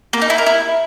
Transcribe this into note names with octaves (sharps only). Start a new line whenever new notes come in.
A#3
D#4
E4
A#4
E4